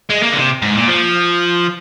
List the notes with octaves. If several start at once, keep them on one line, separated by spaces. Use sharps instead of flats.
G#3
A#3
D3
C3
G#2
A#2
F3